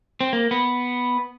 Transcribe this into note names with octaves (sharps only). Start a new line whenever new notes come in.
C4
A#3
B3